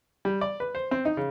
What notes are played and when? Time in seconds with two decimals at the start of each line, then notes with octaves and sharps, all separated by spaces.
0.25 G3
0.41 D5
0.60 B4
0.75 C5
0.91 C4
1.05 D#4
1.17 C#3